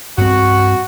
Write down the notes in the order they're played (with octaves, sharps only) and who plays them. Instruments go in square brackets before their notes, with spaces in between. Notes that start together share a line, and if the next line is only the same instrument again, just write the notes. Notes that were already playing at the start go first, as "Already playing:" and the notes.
[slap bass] G2 C4 [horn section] F#4